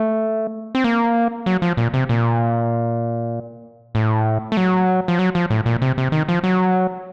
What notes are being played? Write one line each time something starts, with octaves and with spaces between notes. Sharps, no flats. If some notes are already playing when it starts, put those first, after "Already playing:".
Already playing: A3
C4
A#3
F#3
F3
A#2
C3
A#2
A2
A3
F#3
F3
F#3
F3
A2
A#2
C3
C3
D#3
F3
F#3